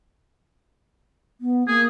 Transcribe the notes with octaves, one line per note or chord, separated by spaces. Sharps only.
B3
A#3 G#4